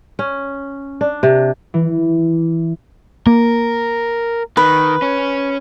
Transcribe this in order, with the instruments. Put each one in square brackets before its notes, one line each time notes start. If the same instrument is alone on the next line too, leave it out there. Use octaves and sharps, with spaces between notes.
[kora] C#4
D4
C3
[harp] E3
[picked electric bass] A#3 [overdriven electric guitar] A#4
[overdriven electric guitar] D#3 [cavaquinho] B4
[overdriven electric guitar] C#4